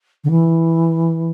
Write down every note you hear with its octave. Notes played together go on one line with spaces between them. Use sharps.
D3
E3